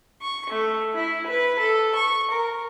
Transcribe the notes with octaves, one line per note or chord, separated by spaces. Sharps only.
C#6
A3
E4
B4
A4
C#6
A#4